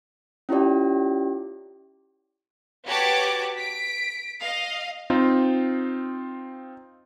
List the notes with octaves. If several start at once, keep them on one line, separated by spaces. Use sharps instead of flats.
C#4 E4 F4 G4 D5
F#4 G4 B4 C#5 A5 D6
B6 D7
D#5 F5
C4 D#4 F4